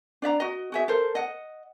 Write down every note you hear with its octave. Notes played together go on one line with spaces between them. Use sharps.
D4 D5 E5 A#5
F#4 D#5
F#4 G#4 E5
A4 A#4 C5
D#5 F#5